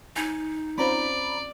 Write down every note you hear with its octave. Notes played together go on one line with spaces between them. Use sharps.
D#4 G#5
C4 C#4 F4 C5 D5 A#5 B5